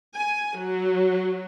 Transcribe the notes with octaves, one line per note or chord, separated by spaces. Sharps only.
G#5
F#3